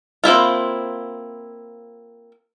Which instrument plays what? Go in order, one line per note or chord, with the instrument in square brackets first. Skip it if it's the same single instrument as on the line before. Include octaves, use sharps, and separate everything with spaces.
[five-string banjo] A#3 C4 E4 F4